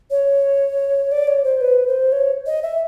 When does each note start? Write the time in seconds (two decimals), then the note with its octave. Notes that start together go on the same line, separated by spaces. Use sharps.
0.11 C#5
1.12 D5
1.27 C#5
1.44 C5
1.61 B4
1.87 C5
2.12 C#5
2.46 D#5
2.62 E5